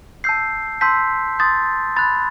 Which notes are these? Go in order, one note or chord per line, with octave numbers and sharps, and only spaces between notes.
A5 E6 G6 C7
A5 C6 E6 G6 B6
C6 D#6 G6 A6
B5 F#6 A6